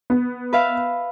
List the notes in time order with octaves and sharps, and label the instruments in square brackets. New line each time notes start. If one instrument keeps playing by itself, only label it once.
[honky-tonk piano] B3
[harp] B4 E5 F5